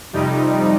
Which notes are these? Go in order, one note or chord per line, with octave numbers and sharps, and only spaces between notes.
F2 C3 G3 D#4